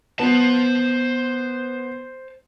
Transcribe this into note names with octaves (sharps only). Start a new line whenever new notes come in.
B3 C5 A5